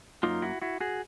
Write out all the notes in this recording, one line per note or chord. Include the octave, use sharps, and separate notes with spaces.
F#2 D#3 F#3 A#3 D#4 F4
E4 F#4
E4 F#4
F#4 G#4